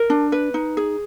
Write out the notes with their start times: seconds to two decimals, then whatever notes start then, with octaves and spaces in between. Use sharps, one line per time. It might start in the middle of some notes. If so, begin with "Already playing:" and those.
Already playing: A#4
0.10 D4
0.32 B4
0.54 D#4
0.77 G#4